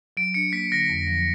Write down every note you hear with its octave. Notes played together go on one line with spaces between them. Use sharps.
F#3 D7
D4 C#7
A#3 B6
D3 A#6
F2
F3